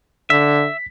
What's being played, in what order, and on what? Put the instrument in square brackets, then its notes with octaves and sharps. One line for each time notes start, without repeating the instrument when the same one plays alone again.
[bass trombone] D3 [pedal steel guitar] E5 [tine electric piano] B6